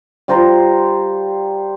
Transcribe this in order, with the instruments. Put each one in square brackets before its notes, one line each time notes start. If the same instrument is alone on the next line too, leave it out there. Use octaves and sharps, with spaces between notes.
[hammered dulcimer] G3 F4 C5 A#5